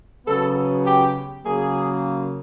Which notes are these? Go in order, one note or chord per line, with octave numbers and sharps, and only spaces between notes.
C#3 F#3 B3 A4
G4
C#3 F#3 A#3 G#4